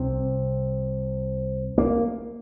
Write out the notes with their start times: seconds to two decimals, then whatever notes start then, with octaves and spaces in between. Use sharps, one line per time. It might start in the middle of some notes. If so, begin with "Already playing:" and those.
Already playing: C2 C3 C4
1.78 A#3